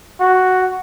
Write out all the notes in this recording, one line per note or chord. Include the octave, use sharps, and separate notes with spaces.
F#4